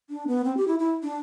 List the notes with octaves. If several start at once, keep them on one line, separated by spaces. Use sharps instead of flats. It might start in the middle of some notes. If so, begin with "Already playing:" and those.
D4
B3
C4
G4
E4
E4
D4